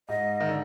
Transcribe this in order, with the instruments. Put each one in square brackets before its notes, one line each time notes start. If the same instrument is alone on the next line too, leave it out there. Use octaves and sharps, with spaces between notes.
[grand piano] G#2 [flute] D#5
[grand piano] D#3
D3